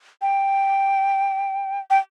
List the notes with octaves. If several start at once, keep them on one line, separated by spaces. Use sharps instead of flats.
G5
G5